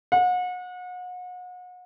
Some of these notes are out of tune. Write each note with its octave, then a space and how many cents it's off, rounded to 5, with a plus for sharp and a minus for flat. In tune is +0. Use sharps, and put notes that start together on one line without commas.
F#5 -35